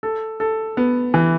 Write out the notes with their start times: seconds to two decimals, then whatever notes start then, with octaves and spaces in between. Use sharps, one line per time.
0.03 A4
0.40 A4
0.77 B3
1.14 E3